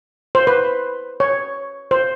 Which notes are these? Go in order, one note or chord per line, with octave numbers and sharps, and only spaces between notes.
C5
B4
C#5
C5